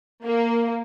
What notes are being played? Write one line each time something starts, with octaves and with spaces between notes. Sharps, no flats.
A#3